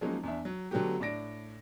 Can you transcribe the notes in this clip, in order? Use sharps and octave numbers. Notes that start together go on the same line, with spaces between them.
F3 F#3 G#3 A#3 C#4 D#4
E2 D4 E5
F#3
D3 F#3 A3 B3 F#4 G4
A2 D4 D5 A#6 D7